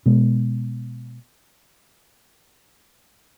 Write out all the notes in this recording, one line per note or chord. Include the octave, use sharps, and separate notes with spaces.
B2 G#3 B3